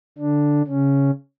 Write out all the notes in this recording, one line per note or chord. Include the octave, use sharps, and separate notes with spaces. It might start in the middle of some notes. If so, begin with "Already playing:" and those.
D3 D4
C#3 C#4